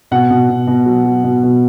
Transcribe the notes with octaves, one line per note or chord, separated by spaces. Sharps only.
B2 F#5
B2
B2
B2
F#3
F#3
B2
B2